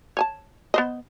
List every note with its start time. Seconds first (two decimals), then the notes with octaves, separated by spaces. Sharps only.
0.17 C#5 G#5 A5
0.74 B3 C5 D#5